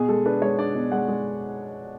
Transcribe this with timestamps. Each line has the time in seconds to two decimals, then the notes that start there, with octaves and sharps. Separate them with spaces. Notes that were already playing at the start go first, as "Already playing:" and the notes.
Already playing: B2 G#4
0.08 G#3 A4
0.26 D4 B4
0.42 G#3 C#5
0.58 D4 D5
0.75 B2
0.92 G#3 F#5
1.08 G#3